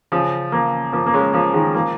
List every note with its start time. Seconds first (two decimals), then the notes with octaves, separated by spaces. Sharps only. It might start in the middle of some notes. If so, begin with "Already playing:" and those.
0.12 C#3 F3
0.52 F3 A#3
0.93 F3 A#3
1.06 A#3
1.13 G#3 C#4
1.34 F3 A#3
1.54 D#3 G#3
1.75 F3 A#3